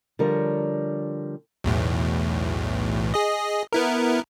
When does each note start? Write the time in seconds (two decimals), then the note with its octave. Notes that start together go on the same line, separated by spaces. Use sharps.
0.19 D3 F3 G3 A#4 C#5
1.64 B1 E2 A2
3.14 G#4 D#5
3.73 B3 E4 A#4